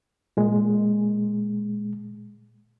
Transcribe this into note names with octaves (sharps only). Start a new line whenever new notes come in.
A#2 G#3